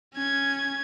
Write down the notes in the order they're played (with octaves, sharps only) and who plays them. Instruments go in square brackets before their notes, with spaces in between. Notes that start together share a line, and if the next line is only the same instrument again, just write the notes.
[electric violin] C#4 G#6